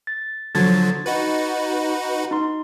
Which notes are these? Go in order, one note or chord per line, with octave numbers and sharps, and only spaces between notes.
A6
D3 F3 F#3 G#6 A6
D#4 F#4 B4
D#4 C6